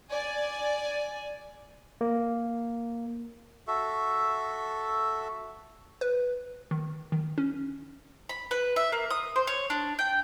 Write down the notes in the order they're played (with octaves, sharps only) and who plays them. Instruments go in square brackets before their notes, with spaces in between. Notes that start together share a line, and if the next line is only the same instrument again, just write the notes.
[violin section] D5 G#5
[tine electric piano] A#3
[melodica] F#4 A4 E5
[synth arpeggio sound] B4
D#3
D#3
C#4
[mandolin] B5
B4
E5
A#3
D#6
C5
C#5
D4
G5